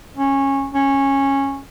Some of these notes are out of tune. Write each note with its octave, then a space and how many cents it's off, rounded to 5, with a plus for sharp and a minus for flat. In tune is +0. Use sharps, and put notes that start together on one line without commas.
C#4 -15
C#4 -15